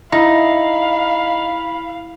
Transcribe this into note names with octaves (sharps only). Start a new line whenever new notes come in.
D#4 E4 F5 B5